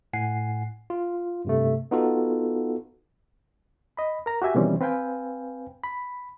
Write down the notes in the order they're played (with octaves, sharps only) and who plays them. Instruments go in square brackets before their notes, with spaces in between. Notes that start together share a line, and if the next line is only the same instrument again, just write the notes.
[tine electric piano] A2 F#5 G#5 C7
F4
G2 C3 A3
B3 D#4 F4 F#4 A4
[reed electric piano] D#5 B5
A#4 A#5
F#4 G4 E5 G#5
B2 D#3 E3 G3 C4 C#4
C4 B4 F5 G5 G#5
B5